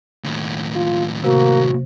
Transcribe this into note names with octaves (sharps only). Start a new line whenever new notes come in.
D#2 A2
F4
C3 A#3 F#4